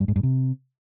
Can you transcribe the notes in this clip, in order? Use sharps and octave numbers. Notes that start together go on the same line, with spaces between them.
G2
G#2
G2
C3